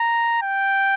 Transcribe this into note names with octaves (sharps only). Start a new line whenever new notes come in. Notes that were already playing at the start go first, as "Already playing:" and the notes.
Already playing: A#5
G5